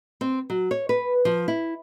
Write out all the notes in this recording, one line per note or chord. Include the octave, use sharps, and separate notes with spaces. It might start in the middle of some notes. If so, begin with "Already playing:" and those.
C4
F#3
C#5
B4
F3
E4